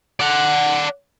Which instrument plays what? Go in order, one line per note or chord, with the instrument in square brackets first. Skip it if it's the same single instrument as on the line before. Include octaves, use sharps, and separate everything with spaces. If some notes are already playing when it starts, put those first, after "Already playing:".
[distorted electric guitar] D5 F#5